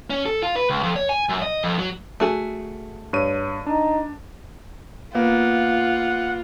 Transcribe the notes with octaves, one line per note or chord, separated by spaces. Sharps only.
C#4
A4
F4
B4
C#2
F2
C#5
G#5
F#2
D#5
F2
F#3
A3 F#4 G#4
G2 C#5 D#7
D4 D#4
A#3 B3 F4 F#5